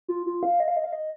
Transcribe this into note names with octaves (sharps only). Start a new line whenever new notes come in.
F4
F4
F5
D#5
F5
D#5
F5
D#5